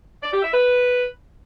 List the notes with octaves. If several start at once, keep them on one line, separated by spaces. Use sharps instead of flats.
D5
G4
E5
B4